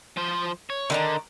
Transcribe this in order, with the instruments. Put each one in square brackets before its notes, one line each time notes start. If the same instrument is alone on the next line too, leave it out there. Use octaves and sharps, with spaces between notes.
[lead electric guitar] F3 C5
C#5
[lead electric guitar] D3 [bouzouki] D#3 D4 A#5